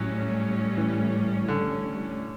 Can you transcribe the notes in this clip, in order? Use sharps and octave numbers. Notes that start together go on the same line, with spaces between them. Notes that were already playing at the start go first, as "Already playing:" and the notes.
Already playing: A2 F#3 G3 C#4
E3
D3